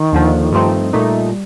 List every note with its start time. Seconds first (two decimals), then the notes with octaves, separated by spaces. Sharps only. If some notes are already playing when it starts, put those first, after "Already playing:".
Already playing: D#3
0.13 D#2 D3 F3
0.52 G2 F3 A3 C4 D#4
0.92 A#2 G3 A3 D#4